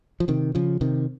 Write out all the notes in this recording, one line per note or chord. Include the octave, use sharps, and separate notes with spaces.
F3
C3 D#3
C#3 F3
C3 D#3